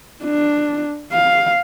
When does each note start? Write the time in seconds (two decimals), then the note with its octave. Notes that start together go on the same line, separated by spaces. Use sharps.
0.24 D4
1.12 F5